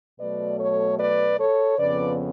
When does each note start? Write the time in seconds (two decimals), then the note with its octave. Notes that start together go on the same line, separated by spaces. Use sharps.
0.19 B2 F#3 A3 B4 D5
0.59 A4 C#5
0.99 B4 D5
1.39 A4 C#5
1.78 F2 C#3 F3 B3 B4 D5